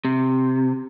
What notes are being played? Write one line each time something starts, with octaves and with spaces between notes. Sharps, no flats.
C3